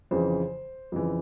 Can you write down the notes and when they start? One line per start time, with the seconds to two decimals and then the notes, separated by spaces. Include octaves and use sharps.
0.11 F2 C#3 E3 C5
0.92 F2 C#3 E3